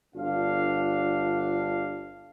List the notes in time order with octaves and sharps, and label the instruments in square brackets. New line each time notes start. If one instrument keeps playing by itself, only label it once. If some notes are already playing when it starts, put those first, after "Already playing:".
[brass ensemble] G1 D4 F4 F5